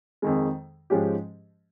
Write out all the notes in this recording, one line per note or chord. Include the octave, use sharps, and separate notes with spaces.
F2 D#3 G#3
G#2 F3 G#3 C#4 G4